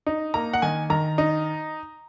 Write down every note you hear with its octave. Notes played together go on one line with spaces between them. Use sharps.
D#4
A#3 A#5
F#5
D#3 G#5
D#3 A#5
D#4